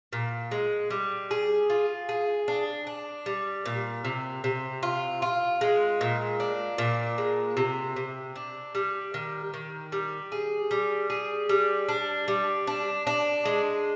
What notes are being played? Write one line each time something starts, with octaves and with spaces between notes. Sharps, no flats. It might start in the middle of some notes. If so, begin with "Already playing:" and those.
A#2
G#3
G3
G#4
F4
G#4
D4
D4
G3
A#2
C3
C3
F4
F4
G#3
A#2
D4
A#2
G#3
C3
C3
D4
G3
D#3
D#3
G3
G#4
G3
G#4
G3
D4
G3
D4
D4
G#3